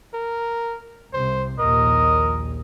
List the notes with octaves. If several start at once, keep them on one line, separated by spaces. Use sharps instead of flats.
A#4
C2 C3 C5
A#1 D#2 A#2 A#4 D#5